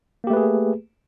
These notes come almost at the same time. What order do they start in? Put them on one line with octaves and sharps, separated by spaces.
A#3 G4 A3 B4 G#4